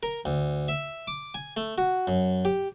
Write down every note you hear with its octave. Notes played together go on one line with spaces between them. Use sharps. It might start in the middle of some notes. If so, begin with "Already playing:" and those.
A#4
D2
E5
D6
G#5
A3
F#4
F#2
G4